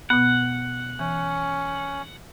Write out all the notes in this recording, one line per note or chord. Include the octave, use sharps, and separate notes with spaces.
B2 B3 F#5
E3 C#4